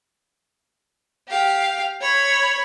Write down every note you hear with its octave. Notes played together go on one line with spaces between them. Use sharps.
G4 F5
C#5 B5